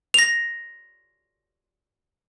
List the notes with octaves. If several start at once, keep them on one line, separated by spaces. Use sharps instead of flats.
A#6 F7